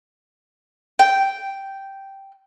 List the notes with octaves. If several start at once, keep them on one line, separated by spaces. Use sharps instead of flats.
G5